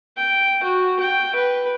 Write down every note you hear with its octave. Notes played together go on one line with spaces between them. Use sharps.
G5
F#4
G5
B4